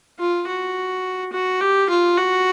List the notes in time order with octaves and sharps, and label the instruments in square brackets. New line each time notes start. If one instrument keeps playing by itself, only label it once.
[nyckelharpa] F4
F#4
F#4
G4
F4
F#4